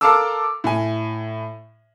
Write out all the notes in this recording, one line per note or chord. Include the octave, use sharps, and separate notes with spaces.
A4 A#4 F5 A5 D6 E6
A2 G#5